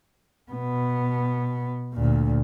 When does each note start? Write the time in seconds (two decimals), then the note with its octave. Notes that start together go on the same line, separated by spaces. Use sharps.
0.52 B2 B3
1.94 D2 A#2